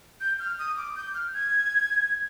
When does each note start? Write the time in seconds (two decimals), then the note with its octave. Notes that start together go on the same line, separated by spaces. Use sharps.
0.21 G6
0.39 F6
0.59 D#6
0.77 D6
0.96 G6
1.15 F6
1.34 G#6